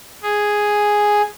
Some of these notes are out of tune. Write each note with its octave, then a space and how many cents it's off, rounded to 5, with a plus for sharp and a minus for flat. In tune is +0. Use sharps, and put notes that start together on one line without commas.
G#4 +0